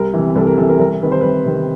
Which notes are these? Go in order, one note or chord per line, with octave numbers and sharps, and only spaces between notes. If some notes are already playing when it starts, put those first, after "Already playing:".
Already playing: C2 A#4
E3
C3
C2 A4
A#4
C3 E3 A4
A#4
C2 A#4
C3 D#3 B4
C5
C2 B4
C3 D#3